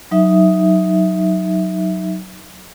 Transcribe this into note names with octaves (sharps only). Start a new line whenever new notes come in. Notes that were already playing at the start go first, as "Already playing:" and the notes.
F#3 D#4 E5